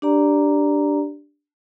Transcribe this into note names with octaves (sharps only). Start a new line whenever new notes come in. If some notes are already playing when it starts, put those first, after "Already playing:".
D4 G4 D5 A#5